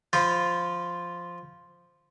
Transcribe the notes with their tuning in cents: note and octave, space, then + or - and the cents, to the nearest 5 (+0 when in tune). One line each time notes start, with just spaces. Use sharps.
F3 +0 F4 +0 B5 +30